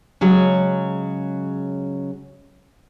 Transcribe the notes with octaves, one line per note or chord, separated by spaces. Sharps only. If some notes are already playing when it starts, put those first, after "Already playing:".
C#3 F#3 G#3